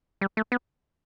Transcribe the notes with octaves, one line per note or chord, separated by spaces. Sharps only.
G3
A3
B3